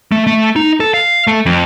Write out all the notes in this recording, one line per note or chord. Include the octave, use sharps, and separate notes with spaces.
A3
A3
D#4
A4
F5
A3
F2